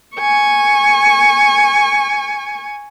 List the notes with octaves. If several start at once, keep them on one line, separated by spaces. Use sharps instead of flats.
G#5 C#6